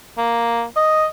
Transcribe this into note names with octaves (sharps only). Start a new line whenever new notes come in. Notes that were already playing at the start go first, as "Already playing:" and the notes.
A#3
D#5